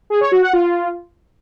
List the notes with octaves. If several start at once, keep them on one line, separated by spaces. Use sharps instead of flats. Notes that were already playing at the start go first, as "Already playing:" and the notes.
G#4
C#5
F#4
F#5
F4